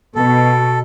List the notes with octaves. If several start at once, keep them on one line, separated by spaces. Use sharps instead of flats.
B2 A4